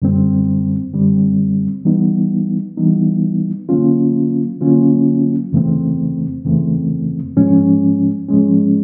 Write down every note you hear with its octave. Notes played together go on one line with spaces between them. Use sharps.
F#2 D3 G3 C4
F#2 D3 G3 C4
E3 G3 B3 D#4
E3 G3 B3 D#4
D3 F#3 A#3 C#4 F4
D3 F#3 A#3 C#4 F4
F2 C#3 E3 A3 C4
F2 C#3 E3 A3 C4
G#2 F3 G#3 C#4
G#2 F3 G#3 C#4